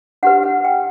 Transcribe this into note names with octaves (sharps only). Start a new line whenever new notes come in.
D4 G4 B4 F#5
F#5
G5